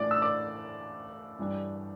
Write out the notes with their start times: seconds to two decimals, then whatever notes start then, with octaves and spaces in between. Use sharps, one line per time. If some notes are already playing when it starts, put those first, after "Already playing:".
Already playing: A2 E3 A3 D4 F4 D5 D6
0.11 E6
0.22 D5 D6
1.39 G2 E3 G3 D4